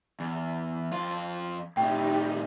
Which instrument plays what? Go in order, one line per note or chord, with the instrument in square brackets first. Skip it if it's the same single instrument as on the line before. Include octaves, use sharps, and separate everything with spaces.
[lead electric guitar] E2
F2 F4
[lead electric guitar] A2 C3 [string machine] D#4 G4 [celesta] G5